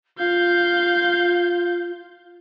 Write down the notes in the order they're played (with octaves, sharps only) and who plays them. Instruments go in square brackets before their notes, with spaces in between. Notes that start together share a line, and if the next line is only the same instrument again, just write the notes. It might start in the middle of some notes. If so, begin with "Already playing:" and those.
[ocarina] F4 [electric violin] F5 G6